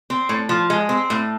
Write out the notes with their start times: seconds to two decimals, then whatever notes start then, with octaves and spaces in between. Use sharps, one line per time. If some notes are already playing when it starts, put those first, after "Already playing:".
0.10 C4
0.29 A2
0.49 F3
0.70 G#3
0.89 C4
1.10 A2